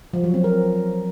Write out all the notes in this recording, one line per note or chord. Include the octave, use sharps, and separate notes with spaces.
F3
F#3
C4
A#4